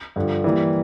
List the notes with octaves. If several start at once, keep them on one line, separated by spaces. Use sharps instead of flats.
G2 D3 F3
E3 G3 A#3